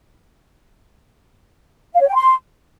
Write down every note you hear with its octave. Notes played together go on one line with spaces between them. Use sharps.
F5
C#5
G5
C6